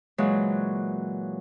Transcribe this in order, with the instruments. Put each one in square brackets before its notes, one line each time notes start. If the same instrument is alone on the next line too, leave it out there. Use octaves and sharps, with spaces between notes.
[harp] A#2 E3 F#3 G#3